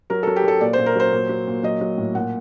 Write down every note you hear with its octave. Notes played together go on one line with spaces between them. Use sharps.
F#3 A#4
A4
F#3
G4
F#3 A4
A#2 D5
C5
A#2
A#4
F#3 C5
A#2
F#3
A#2
F#3 D#5
F#3
A2
A#2 F#5